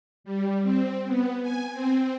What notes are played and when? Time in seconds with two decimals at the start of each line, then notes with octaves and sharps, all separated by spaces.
0.24 G3
0.63 C4
1.06 B3
1.42 G#5
1.73 C4